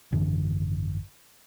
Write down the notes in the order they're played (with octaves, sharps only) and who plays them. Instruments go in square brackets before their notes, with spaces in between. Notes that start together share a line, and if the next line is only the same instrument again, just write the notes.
[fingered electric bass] G#1 F#2 D3 E3